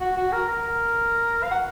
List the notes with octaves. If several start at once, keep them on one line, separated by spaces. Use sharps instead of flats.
F#4
F#4
A#4
A#4
F5
F#5